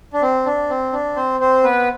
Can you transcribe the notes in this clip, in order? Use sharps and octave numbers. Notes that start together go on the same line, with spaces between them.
D4
C4
D4
C4
D4
C4 C5
C4 C5
B3 B4